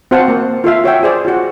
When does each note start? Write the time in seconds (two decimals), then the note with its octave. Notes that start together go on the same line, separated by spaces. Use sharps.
0.11 C4 F#4 C5 F5 F#5 A5
0.28 A#3
0.64 F4 A4 E5 F5
0.84 F#4 C#5 E5 G5
1.03 G#4 C5 D5
1.25 F4 F#4